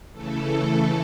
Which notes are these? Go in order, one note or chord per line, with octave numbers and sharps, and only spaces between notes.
C#3 E3 A3 A4